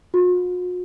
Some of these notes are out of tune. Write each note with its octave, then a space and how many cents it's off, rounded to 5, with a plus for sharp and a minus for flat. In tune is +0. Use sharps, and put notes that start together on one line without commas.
F#4 -45